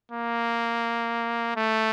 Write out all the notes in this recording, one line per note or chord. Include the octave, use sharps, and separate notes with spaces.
A#3
A3